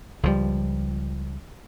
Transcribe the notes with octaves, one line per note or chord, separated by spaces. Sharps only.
C#2 F3 G3